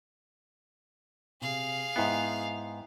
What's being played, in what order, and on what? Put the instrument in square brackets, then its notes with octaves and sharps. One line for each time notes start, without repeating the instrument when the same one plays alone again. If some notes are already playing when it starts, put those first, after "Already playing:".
[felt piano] C3 [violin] G#4 F5
[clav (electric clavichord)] G#2 B3 [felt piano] E4 E5 G5